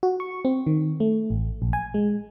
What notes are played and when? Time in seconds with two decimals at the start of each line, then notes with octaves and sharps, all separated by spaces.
0.03 F#4
0.20 C#6
0.45 C4
0.67 D#3
1.00 A3
1.30 A1
1.62 A#1
1.73 G#5
1.94 G#3